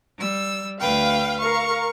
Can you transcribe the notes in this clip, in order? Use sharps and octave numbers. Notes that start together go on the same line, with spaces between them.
G3 E6
D2 B4 F5 G5
A#4 F5 C#6